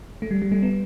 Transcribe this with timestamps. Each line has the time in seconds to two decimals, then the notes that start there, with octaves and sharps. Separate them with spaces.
0.22 A3
0.31 G3
0.42 G3
0.52 A3
0.63 B3